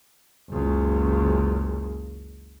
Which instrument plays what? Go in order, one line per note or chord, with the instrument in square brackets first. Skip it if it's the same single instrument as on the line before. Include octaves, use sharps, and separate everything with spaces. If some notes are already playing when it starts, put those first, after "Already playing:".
[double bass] F#1 C#2